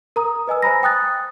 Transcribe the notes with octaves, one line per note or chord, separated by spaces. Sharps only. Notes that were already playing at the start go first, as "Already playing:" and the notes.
A#4 A#5 D#6
B4 D#5 G#5 E6
C5 G#5 A#5 B5 A#6
G5 D#6 F#6 A6